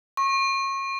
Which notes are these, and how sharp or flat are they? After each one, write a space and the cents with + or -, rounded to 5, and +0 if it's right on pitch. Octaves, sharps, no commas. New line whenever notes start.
C#6 -30